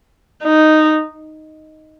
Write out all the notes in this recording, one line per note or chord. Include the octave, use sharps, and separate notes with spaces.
D#4